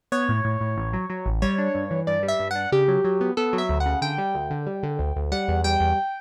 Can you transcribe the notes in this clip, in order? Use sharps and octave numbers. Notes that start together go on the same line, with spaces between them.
B3 C#5
A2
A2
A2
A1
F#3
F#3
A1
G3 C#5
D4
G2
E3
G2 D5
G3
E5
G2
D4 F#5
C#3 G4
F#3
F#3
B3
B3 A4
F#3
E5
D2
F#5
C#3
D3 G5
G3
D2
D3
G3
D3
D2
D2
G3 F#5
E2
G3 G5
E2